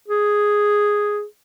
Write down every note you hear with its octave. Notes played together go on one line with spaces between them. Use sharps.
G#4